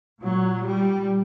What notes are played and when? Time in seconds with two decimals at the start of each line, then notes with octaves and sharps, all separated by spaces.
0.22 A#2 F#3
0.62 G3